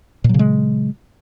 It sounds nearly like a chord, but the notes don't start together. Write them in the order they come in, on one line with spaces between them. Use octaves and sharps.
A#2 F#3 C#3 G#3